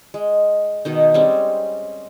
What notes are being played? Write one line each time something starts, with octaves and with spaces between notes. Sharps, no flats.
G#3
B2 D#3 D#4
G3 G#3 C4 C#4